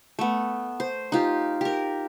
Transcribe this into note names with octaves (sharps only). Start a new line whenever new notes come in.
A3 B3
C5
D#4 F4 G4
G4 A#4